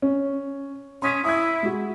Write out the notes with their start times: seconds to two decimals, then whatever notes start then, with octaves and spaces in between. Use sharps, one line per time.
0.02 C#4
1.02 C#4 C6 D#6 B6
1.24 E4 D#6 G#6
1.63 G#3 F#4